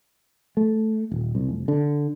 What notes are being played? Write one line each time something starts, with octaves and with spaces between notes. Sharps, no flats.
A3
D#1
C2
F1
D3